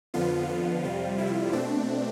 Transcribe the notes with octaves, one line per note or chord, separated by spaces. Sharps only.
F2 D3 F3 B3 F4
F4
F2 C3 G3
E4
B2 A3 C4 D4